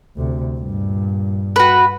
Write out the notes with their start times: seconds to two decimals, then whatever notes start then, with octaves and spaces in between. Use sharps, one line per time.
0.17 D2 C3
0.58 G2 A#2
1.56 F#4 B4